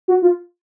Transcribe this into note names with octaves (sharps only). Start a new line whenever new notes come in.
F#4
F4